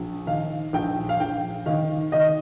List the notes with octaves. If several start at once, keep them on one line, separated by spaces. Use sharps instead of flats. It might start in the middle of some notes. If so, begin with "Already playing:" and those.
Already playing: A#1
D#3 F5
A#1 G5
F5
A#1 G5
D#3 F5
D#3 D#5